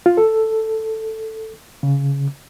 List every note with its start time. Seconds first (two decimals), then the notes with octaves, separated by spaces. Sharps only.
0.06 F4
0.17 A4
1.83 C#3